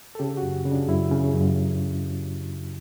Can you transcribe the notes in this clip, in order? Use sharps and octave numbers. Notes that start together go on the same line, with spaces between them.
A4
C#3 G4
F#4
F#2
C#3
D4
F#2 E4
C#3
F#2